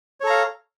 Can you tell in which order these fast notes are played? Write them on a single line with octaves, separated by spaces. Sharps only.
C#5 A4 A#5 F5